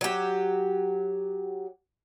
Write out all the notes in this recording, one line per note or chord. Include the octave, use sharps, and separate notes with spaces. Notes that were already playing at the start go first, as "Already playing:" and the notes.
F#3 G4